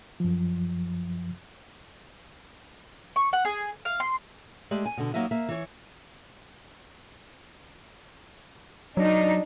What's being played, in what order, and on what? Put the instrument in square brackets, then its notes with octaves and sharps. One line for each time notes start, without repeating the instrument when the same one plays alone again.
[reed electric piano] F#2 F3
[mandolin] C#6
F#5
G#4
F5
C6
[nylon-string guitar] G#3 A3 G4 D5
G#5
B2 D3
F#3 A#3 D#4 D#5 E5
A#3 E5
E3 C#5
[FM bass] F#3 [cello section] D4 D#4